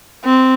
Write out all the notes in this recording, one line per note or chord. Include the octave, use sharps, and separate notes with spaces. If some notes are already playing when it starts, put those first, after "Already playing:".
C4